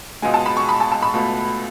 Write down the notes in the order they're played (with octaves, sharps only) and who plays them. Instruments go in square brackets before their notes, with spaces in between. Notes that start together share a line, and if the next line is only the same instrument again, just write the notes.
[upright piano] C#2 B2 G#3 G#5
A5
B5
C#6
B5
A5
A5
B5
C#2 B2 A3